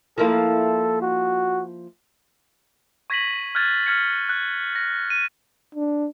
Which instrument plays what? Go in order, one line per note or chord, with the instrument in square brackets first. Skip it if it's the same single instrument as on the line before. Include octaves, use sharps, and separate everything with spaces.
[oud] F3 A#3 E4 [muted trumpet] A4
[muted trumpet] F#4
[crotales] C#6 G#6 A#6 B6 D#7 F#7
F6 F#6 G#6 A6
F6 G#6 C#7
F#6
A#6
D#7
[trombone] D4